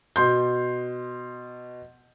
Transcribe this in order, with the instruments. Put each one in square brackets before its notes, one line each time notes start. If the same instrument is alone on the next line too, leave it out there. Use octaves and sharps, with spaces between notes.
[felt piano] B2 C6 G6